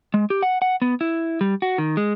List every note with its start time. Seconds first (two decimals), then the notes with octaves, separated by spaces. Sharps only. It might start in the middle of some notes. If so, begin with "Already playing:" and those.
0.14 G#3
0.30 G4
0.43 F#5
0.62 F#5
0.82 B3
1.01 E4
1.41 G3
1.62 F#4
1.78 D#3
1.97 G#3